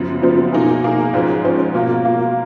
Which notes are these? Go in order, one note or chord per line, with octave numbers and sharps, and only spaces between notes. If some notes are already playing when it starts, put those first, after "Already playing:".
Already playing: F#2 C#3 F3 B3
F#2 C#3 F3 B3
B2 A#3 D#4 G#4
B2 A#3 D#4 G#4
G#2 F3 G#3 C#4
G#2 F3 G#3 C#4
B2 A#3 F4
B2 A#3 F4